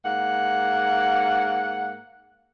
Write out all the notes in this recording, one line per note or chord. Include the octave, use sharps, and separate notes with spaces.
G#2 A#3 F#5